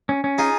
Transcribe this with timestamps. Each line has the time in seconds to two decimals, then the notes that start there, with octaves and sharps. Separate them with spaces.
0.09 C#4
0.24 C#4
0.38 D#4 F4 G#4